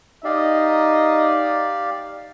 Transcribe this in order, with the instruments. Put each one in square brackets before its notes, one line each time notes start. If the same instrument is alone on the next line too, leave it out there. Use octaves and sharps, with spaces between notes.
[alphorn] D#4 [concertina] G4 D5 F5 [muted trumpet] D#5